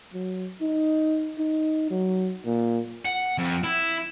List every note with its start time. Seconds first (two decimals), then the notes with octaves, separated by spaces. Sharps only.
0.13 F#3
0.61 D#4
1.38 D#4
1.91 F#3
2.46 A#2
3.05 F#5
3.38 F2
3.64 E4